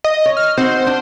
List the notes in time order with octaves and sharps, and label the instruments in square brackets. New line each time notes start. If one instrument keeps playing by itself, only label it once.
[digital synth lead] D#5
[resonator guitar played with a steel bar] C#5
[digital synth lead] F6
[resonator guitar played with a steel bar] C4 D#4 F#4 [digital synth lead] C5
[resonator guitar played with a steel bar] D4